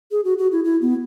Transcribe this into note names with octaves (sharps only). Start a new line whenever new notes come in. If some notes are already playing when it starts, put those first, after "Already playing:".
G#4
F#4
F#4
E4
E4
B3